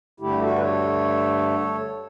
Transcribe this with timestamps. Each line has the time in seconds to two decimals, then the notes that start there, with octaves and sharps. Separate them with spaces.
0.20 G2 D3 A3 E4 G4
0.41 F#4 A4
0.57 B4
0.63 A4 C#5